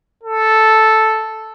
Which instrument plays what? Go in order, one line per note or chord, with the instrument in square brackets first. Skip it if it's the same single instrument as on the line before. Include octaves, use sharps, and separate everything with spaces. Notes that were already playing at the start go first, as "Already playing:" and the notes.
[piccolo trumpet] A4